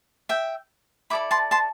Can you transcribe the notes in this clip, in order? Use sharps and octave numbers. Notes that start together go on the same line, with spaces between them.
E5 G5
E4 A4 D5 B5 D6
A5 C6
A5 C6